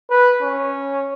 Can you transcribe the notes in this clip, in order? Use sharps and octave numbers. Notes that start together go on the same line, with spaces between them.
B4
C#4